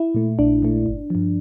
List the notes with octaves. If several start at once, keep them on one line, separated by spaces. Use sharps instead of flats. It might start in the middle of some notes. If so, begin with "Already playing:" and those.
Already playing: E4
A#2 A3
A#1 D4
A#2 A3
G1
G2 F3